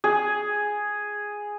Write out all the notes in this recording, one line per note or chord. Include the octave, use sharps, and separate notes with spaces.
G#4